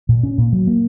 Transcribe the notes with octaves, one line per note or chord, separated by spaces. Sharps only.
A#2
C#4
A#2
F#3
A#3